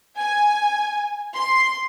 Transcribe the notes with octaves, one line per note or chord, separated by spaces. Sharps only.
G#5
C6